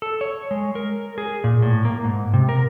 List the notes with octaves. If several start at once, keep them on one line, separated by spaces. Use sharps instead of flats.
A4
C#5
G#3
A#4
G#4
A#2
A2
A#3
G#2
C3
A#4